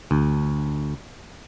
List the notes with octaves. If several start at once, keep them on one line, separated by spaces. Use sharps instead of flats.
D2